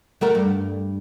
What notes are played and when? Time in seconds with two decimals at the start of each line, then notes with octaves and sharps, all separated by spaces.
0.21 A3 F#4 A#4
0.35 G2